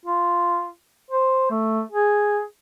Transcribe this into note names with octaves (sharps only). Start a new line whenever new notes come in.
F4
C5
A3
G#4